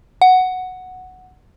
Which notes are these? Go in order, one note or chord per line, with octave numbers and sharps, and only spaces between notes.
F#5